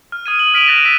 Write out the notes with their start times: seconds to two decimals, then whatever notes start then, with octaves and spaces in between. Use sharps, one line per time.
0.12 F6
0.26 D#6 G#6 D#7
0.39 F#7
0.54 F6 B6 D7 D#7 F7
0.66 F#6 A6 A#6 D#7 E7
0.85 E6 B6 D#7